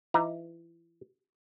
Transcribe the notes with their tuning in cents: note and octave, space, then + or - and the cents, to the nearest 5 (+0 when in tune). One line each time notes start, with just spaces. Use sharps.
E3 +30 D#4 +30 A#5 +0